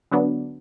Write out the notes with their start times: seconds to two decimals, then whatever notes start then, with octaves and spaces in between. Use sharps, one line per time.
0.11 D3 F#3 B3 D4